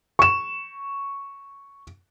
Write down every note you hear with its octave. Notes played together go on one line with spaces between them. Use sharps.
C#6 E7